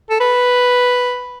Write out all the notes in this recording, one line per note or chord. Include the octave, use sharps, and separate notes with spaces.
A4
B4